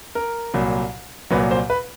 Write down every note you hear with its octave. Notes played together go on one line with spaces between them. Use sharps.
A#4
C2 A#2 F#3
C2 A#2 F#3 B4
C5
B4